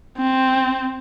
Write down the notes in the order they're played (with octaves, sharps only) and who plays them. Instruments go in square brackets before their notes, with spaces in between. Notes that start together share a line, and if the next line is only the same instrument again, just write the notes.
[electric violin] C4